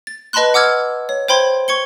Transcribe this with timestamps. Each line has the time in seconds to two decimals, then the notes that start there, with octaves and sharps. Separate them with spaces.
0.07 A6
0.33 B4 D#5 A5 B5 C6 F#6
0.54 F#5 D6 E6 F6 G#6
1.09 C#5
1.28 C5 G5 B5 C6 G#6
1.68 C#6 G#6 C#7 G7